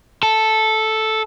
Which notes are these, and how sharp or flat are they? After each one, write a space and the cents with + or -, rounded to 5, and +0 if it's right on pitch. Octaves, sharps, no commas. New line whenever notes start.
A4 -5